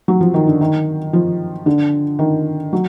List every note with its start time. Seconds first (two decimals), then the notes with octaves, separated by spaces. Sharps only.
0.08 F#3
0.21 F3
0.34 D#3
0.47 D3
0.61 D#3
1.13 F3
1.66 D3
2.19 D#3
2.73 F#3